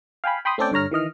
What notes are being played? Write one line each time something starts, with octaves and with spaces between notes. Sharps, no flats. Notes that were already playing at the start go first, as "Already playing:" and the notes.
F5 G5 G#5 B5
G5 B5 C6 D#6
A3 C4 C#4 A4 D5 G5
G2 D3 C#5 A#5 F6
D#3 E3 D#5 F6